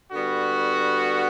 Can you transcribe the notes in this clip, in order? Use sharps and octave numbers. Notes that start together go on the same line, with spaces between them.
D3 G3 B3 F#4